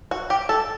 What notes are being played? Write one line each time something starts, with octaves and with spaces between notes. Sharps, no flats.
F#4
G4
A4